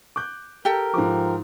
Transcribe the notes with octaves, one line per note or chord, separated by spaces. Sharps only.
D6 F#6 G6
G4 A4 A#4 G5
G#2 F3 D6